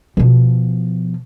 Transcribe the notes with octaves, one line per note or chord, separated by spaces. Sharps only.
B2 F3